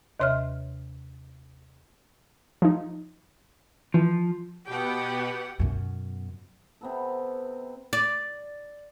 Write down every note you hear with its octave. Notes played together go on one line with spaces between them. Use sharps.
D#2 C3 C#5 E5 F6
F3 D#4
E3 F3
B2 B3 G4 F#5 G5
F#2 B2
C3 B3 A4
D5